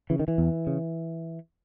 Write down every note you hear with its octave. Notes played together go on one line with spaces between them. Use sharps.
C#3 E3
D#3
E3
E2
C#3